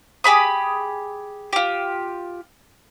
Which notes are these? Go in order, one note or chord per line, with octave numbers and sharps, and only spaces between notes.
G4 G#4 B5 D#6
F4 G4